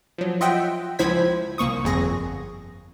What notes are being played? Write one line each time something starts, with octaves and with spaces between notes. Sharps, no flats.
F3 F#3
F4 D#5 E5 F#5 G5
C#2 F3 E4 C5 G#6 B6
C2 A#3 C#6 D#6
G1 F2 G#4 A#6